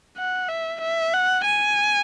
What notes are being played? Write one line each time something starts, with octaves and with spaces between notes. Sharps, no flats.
F#5
E5
E5
F#5
G#5